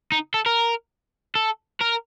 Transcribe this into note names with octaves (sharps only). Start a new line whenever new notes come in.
D#4
A4
A#4
A4
A#4